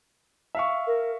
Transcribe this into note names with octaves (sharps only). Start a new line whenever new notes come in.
E5 F5 C#6
A#4